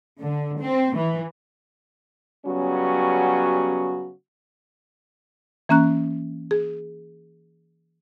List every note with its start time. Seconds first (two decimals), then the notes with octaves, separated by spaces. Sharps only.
0.19 D3
0.60 C4
0.96 E3
2.45 C#3 F#3 G3 B3 C#4 F#4
5.69 E3 A#3 C#4 A#5 F#6
6.51 G#4